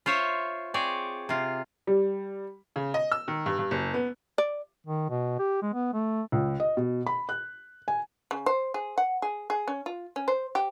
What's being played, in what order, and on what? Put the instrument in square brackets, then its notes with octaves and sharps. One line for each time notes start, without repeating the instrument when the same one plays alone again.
[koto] F4 C5 C#5 E5
C4 G#4 C#5 D5
C3 F4
[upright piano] G3
C#3
D#5
E6
D#3
G2
G2
F#1
B3
[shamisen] D5
[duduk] D#3
B2
G4
G#3
B3
A3
[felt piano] C#2
D#5
B2
B5
F#6
G#5
[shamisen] C#3
C5
G#4
F#5
G#4
G#4
C#4
F4
C#4
C5
G4